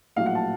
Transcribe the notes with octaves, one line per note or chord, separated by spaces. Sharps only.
A#1 A2 F#3 F5
F#5
A5